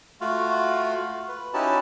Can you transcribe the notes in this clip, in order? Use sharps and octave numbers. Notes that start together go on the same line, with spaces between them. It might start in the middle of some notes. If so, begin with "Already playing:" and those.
A3 F4 F#4 F5
B4
C#4 D#4 E4 F#4 G4 A5